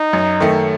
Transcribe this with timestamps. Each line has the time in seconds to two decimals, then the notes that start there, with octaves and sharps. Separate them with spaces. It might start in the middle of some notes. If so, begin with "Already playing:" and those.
Already playing: D#4
0.13 F#2
0.40 D#3 A3